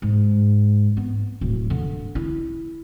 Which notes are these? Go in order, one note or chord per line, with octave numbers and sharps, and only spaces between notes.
G#2
B3
D1
D3
E4